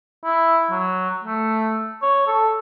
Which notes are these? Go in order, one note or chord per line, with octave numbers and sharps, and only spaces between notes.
E4
F#3
A3
C#5
A4